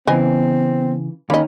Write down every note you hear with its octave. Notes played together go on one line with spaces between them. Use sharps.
C#3 E3 B3 C4 B4 D#5 G#5
D#3 A#3 C#4 D#5 B5